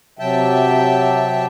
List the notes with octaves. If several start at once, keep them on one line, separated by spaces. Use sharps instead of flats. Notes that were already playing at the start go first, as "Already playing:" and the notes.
C3 F#3 E5 G5 A5